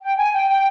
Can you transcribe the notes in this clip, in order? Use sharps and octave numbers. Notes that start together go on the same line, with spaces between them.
G5
G#5
G5
G5